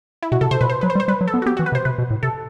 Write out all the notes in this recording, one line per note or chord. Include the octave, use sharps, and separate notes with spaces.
E4
B2 F#4
C3 A4
C3 C5
B2 B4
C5
F#3 B4
C5
G3
C5
G3 B4
F#3
A4
B3
F#4
B3 G4
E3 F#4
B4
C3
C5
C3 B4
B2
A2
C3 A4